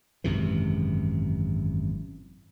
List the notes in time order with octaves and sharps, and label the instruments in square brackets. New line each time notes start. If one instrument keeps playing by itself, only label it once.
[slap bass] G#1 F#2 C3 E3